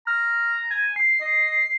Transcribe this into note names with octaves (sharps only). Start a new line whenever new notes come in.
A#5 F6
G#5
C7
D#5